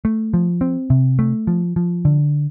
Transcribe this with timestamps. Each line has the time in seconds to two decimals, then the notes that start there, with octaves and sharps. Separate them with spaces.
0.05 A3
0.34 F3
0.61 C4
0.90 C3
1.19 A3
1.47 F3
1.76 F3
2.05 D3